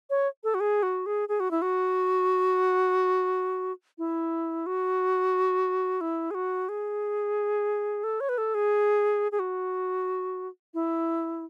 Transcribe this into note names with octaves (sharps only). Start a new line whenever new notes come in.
C#5
A4
F#4
G#4
F#4
G#4
G#4
F#4
E4
F#4
E4
F#4
E4
G#4
F#4
G#4
A4
C#5
B4
A4
G#4
G#4
F#4
E4